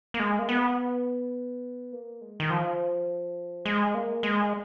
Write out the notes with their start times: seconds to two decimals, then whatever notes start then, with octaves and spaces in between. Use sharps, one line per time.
0.14 A#3
0.19 G#3
0.39 A#3
0.49 B3
1.92 A#3
2.21 G#3
2.40 D#3
2.50 F3
3.65 G#3
3.94 A#3
4.23 G#3